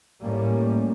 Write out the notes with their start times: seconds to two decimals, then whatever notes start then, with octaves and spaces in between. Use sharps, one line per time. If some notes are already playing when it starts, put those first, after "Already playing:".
0.22 A2 G3 A3 A#3 C#4